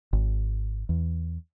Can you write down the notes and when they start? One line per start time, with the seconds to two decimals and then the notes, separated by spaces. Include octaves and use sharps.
0.13 G#1
0.89 E2